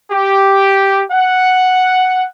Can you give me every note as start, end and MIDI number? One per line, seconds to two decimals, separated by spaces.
0.11 1.02 67
1.11 2.26 78